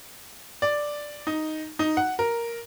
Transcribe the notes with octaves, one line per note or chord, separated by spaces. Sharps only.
D5
D#4
D#4
F#5
A#4